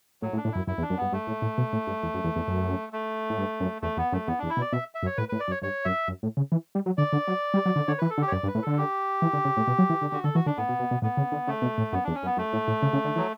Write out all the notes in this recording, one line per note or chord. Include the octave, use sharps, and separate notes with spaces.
A2 F#3
A2
D4
A2
F#2 E4
F#2 E4
E2
D4
F#2
G2 B3
G2 A3
A2
A2
B2
A2
G2
E2
F#2
E2
E2
F#2
A3
A2
G2
F#2
E2 A3
E2 B3
F#2 A3
E2 B3
E2 D4
E4
B2
D5
B2 E5
E5
F#2
C#5
A2 B4
A2 B4
D5
F#2
C#5
G2 C#5
F#2 E5
F#2
A2
C#3
E3
G3
F#3
D3 D5
D3
F#3
G3
F#3
D3
D3 C#5
E3 B4
A4
D3
G4
C#5
F#2 D5
G2
B4
A2
D3 A4
G4
E3
D3
C#3
A2
B2
F#3
E3
D3
D3 F#4
D3 A4
E3 F#4
D3 D4
A2 B3
B2
B2
B2
A2 B3
C#3
D3
C#3 A3
B2
A2
F#2 B3
E2 D4
C#4
F#2
B3
F#2 A3
A2
A2
C#3
C#3
D3
E3 F#3